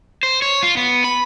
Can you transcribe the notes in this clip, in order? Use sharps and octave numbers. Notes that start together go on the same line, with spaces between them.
C5
C#5
F4
B3
B5